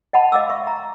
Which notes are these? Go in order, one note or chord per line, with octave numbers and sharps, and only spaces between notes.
D#5 F#5 A5 B5
D#5 F5 D6 E6
E5 C#6
A#5